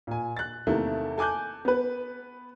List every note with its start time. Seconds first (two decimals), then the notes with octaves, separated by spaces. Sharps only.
0.07 A#2 G#5
0.37 F#6 A6
0.67 E2 C3 D#3 A3 A#3 E4
1.18 A4 G#5 D6 F#6 G6
1.65 B3 B4